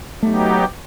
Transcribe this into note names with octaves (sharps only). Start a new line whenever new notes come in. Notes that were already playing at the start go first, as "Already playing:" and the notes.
F#3 A3 B3 D#4 G4